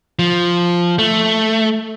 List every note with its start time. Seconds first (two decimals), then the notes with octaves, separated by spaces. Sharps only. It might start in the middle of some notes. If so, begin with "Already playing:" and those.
0.19 F3
0.99 A3